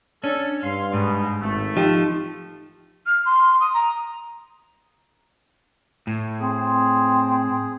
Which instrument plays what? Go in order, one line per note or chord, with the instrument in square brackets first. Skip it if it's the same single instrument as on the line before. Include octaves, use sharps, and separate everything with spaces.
[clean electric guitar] C#4 [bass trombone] D4 [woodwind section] A4
[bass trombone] G2 [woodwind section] F5 C6
[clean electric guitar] G#2 [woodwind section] B2 D#4
[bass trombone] G#1 [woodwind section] A3
[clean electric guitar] F3 [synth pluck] D#4 G4
[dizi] F6
C6
D#6
A#5
[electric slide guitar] A2
[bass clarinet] C4 [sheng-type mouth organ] G#4